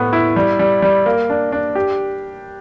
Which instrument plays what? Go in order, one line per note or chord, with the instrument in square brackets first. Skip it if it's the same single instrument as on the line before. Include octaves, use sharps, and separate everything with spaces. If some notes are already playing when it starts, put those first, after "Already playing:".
Already playing: [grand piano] A2 B3
E4
G3
G3
G3
A#3
D4
D4
G4